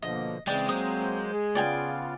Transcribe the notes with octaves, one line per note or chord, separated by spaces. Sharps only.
B2 D3 F3 A#3 D#5
C#3 E3 G#3 C4 D5 G5
F#3 A#3 C5 D#6
G#4
C#3 B3 F4 D5 G5 G#5